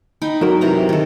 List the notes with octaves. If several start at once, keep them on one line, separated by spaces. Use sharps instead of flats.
D#4 G5 B5
G2 F#3 A#4
C3 E3 A#5
D#3 A4